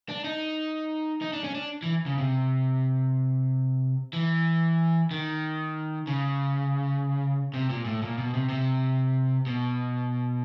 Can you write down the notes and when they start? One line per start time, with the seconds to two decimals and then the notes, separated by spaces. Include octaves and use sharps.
0.09 D4
0.24 D#4
1.22 D#4
1.33 D4
1.44 C#4
1.55 D4
1.83 E3
2.06 C#3
2.18 C3
4.13 E3
5.11 D#3
6.07 C#3
7.54 C3
7.70 A#2
7.85 A2
8.02 A#2
8.18 B2
8.34 C3
8.49 C3
9.47 B2